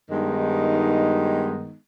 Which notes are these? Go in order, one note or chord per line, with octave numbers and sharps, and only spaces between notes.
G2 D#3 G#3 B3 D#4